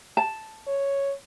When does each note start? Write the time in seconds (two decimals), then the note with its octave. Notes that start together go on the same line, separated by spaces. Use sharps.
0.17 A5
0.67 C#5